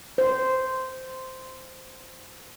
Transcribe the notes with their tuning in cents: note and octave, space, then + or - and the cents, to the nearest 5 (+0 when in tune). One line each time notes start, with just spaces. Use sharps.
C5 -10